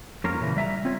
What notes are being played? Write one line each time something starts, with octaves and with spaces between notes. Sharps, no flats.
F2 A#3 C#4 F4 A#4 A#5
A#2 C#3 E3
G3 E5 G#5 A#5
C4 F4 C#5